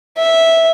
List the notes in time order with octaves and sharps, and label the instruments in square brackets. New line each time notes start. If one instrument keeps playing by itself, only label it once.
[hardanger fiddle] E5